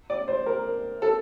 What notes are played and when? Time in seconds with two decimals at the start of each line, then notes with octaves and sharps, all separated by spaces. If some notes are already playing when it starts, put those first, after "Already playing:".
0.10 D5
0.28 C5
0.46 A#4
1.02 A4